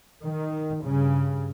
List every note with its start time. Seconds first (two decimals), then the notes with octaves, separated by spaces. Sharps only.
0.23 D#3
0.82 G2 C#3